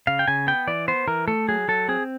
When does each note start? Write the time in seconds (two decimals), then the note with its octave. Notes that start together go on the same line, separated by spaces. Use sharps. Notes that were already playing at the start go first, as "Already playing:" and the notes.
0.07 C#3 F5
0.19 G5
0.28 C#3 G#5
0.47 B3 G5
0.67 E3 D5
0.88 B3 C5
1.08 E3 A#4
1.28 A3 A4
1.48 F#3 G#4
1.68 F#3 A4
1.88 C4 G#4